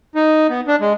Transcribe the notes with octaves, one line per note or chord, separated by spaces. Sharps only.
D#4
B3
D4
G#3